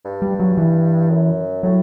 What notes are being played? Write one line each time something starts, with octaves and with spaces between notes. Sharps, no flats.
G2
G3
F#3
E3
F#2
A2 F#3